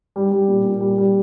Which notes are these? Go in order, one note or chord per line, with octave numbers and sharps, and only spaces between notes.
G3
G3
A#2
A#2
G3
G3